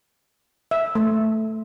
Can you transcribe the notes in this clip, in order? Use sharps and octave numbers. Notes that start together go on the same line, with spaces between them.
E5
A3